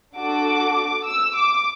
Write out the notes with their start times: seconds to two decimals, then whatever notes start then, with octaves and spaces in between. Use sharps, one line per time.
0.16 D4 F#4 A4 D6
1.05 E6
1.34 D6